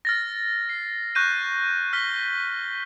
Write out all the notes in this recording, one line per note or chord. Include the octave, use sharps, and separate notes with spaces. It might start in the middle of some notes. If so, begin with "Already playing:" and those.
F6 A6 A#6
C7
C#6 F#6 G6 A#6 D#7
F6 B6 G7